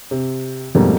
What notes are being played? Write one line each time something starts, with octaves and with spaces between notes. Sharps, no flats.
C3
F2 G#2 B2 G3 A3 A#3